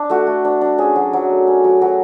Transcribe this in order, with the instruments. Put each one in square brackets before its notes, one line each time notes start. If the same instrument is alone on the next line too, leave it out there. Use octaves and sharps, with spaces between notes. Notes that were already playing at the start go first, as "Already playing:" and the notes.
Already playing: [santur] D4
A3 F#4
A3
D4
D4
C#4 G#4
F#3
F#3
A3
C#4
F#3
F#3